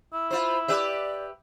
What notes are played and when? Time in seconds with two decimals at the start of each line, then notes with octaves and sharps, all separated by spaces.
0.13 E4 E6
0.31 F4 C5 B5
0.68 G4 B4 D5 E5